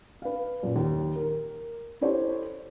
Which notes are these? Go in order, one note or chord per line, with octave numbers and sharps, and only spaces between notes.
B4 F5
F#2 A#2
D#2
A#4
E4 G4 A4 C5 C#5